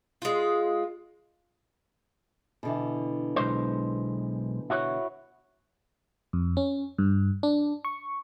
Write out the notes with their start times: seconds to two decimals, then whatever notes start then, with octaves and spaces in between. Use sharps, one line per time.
0.22 G#3 F4
2.63 B2 D3 E3
3.36 B1 G#3 C5
4.70 E4 F#4 C#5
6.33 F2
6.57 C#4
6.98 G2
7.43 D4
7.85 C#6